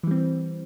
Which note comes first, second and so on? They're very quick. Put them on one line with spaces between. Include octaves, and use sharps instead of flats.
E3 G3 C4